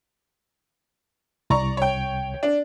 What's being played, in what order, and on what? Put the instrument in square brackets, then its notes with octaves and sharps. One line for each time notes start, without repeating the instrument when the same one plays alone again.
[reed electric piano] C2 [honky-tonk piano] D5 A#5 C#6
[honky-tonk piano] C#5 G5
D4